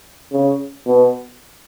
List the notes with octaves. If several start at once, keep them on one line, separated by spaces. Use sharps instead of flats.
C#3
B2